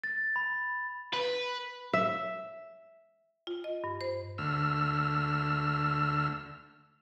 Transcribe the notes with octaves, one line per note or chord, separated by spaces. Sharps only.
A6
B5
B4
E5
F4
D#5
G2
C5
D2 E6 F6